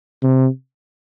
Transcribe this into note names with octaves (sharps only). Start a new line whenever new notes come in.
C3